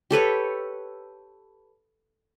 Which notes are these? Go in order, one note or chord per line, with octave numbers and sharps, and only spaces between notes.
G4 A4 B4 C#5